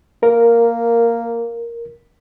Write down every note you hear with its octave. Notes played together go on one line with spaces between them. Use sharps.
A#3 A#4